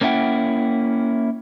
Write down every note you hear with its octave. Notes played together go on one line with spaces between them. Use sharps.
A#3 C#4 D4 E4 F#5 G5